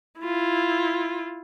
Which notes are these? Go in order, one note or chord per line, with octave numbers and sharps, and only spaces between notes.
E4 F4